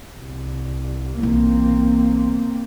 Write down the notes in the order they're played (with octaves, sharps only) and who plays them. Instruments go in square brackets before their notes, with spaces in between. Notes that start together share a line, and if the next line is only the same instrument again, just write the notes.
[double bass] C2
[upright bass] B1 E3 [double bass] A#3 C4